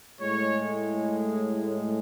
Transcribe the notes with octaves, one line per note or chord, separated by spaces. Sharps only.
A2 G#3 C#5